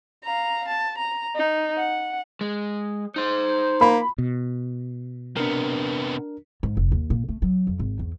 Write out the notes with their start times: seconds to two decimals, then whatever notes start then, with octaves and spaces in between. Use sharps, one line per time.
0.24 F5 A#5
0.68 A5
0.98 A#5
1.36 D#4
1.77 F#5
2.41 G#3
3.16 D#4 C5 C6
3.81 A#3 B5
4.18 B2
5.37 C3 B3 D4 A#4
6.63 G#2
6.77 F1
6.92 D#2
7.10 A#2
7.29 A3
7.42 F#3
7.67 F2
7.79 G#1
7.99 E2